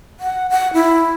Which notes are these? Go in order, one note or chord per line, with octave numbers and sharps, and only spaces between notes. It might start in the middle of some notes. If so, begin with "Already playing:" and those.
F#5
F#5
E4